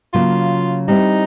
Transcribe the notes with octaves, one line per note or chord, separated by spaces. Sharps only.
C#3 F#3 A#3 F4
G3 C4 D#4 E4